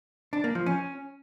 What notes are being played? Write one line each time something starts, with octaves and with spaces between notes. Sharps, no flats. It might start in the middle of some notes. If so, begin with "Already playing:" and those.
D4
A#3
F3
C#4